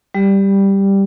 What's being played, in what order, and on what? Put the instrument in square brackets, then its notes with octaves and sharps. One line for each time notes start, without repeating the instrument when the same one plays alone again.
[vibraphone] G3 G4